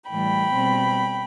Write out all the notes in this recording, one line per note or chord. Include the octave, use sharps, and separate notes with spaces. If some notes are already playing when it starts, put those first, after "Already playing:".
A2 E3 G3 G5 B5
B2 G3 C4